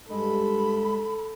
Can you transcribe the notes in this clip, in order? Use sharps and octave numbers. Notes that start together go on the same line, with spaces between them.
G2 G#3 A4 B5